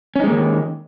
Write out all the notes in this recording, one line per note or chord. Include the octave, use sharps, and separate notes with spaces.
D#3 G#3 A#3 C#4 D#4